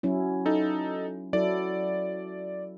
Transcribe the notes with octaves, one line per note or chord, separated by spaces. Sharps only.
F#3 C#4 E4
D#4 A4
F#3 E4 A4 D5